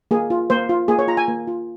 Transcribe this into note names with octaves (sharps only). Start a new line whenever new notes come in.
A#3 G#4
F4
A#3 C5
F4
A#3 G#4
C#5
F4 A#5
G#5
A#3
F4